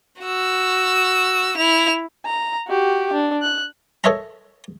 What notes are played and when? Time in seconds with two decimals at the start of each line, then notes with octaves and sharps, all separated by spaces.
0.22 F#4 E6
1.58 E4 F7
2.26 A#5
2.68 F#4 G4
3.13 D4
3.42 F#6
4.04 A4 A#4 C#5 D#5 E5 A#5